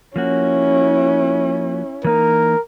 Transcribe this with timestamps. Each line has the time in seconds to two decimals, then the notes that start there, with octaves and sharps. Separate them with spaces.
0.16 F3 A#3 C#4 E4 F#4
2.04 E3 A#3 D#4 A#4